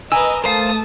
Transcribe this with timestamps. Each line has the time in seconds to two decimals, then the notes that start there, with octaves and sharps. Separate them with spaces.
0.12 A#4 B4 D#5 G#5 E6
0.44 A3 A#4 C5 F5 A5 D#6